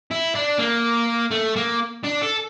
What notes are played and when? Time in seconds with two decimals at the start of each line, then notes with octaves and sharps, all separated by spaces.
0.11 E4
0.35 D4
0.59 A#3
1.31 A3
1.56 A#3
2.04 D4
2.22 A4